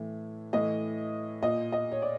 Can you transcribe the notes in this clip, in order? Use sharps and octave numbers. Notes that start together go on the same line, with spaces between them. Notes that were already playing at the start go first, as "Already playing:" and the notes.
Already playing: A2 E3
A2 E3 D#5
A#2 D#5
D#5
C#5
D5